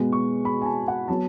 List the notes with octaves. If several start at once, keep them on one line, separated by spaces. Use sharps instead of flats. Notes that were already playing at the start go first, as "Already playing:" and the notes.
Already playing: B2 G#3 B3
C#6
B5
G#5
A5
F#5
F#3 B3 A5